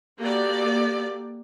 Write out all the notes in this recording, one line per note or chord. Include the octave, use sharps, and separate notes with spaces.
A#3 B3 F#4 G4 A4 D5